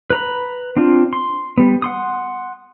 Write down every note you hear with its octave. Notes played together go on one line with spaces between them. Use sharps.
B4 A#5 B5
C4 D4 F4
C6
G3 B3
F#5 C6 D#6